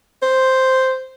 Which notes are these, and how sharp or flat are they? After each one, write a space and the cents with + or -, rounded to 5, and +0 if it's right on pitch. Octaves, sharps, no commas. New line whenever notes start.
C5 +0